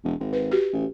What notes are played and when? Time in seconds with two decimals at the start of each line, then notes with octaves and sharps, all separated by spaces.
0.04 E1
0.20 G#1
0.33 B4
0.51 F#4 G4
0.73 A1